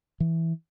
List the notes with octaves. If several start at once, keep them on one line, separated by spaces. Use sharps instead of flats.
E3